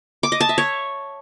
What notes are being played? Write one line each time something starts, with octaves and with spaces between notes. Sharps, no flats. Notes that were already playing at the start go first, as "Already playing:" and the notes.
D6
D#5
A5
E5
C#5